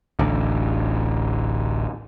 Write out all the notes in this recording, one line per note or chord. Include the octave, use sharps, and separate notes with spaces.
D1 A1 D2